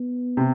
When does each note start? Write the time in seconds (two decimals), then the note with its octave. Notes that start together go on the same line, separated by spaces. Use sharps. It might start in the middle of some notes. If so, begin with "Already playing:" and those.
Already playing: B3
0.37 C3